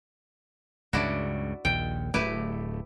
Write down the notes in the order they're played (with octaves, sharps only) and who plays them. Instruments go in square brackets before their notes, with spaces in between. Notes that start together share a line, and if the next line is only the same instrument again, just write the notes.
[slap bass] C#2 G2 C#3 [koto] D4 E4 F#4
[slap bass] A#1 D#2 [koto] G5
[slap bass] D1 A3 [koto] E4 G4 B4